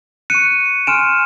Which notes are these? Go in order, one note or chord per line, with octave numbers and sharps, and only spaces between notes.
C#6 F#6 C#7 D#7
G#5 C6 F6 D7 E7